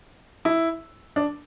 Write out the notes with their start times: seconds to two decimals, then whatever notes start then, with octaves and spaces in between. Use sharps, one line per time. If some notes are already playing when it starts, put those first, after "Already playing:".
0.45 E4
1.16 D4